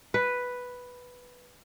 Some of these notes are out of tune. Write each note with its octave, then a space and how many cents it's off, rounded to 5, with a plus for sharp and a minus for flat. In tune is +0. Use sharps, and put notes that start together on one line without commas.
B4 +0